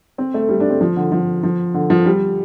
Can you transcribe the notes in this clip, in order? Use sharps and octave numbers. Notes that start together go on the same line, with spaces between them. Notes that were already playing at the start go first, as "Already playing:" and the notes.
C4
A3
G3
D4
C4
F3
D3
F3
F3
D3
F3
G3